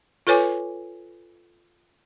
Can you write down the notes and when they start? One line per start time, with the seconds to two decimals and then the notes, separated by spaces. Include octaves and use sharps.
0.27 F4 A4 B4 C#5 G#5 D6